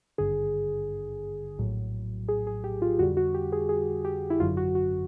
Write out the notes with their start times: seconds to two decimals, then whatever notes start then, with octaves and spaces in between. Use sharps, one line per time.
0.18 G#1 G2 D3 G#4
1.59 A#1 A2 F#3
2.29 G#4
2.47 G#4
2.64 G4
2.82 F4
2.99 F2 D3 G3 F#4
3.17 F#4
3.34 G4
3.52 G#4
3.69 G#4
4.05 G4
4.30 E4
4.39 G#1 F#2 D3 F#3 F4
4.57 F#4
4.75 F#4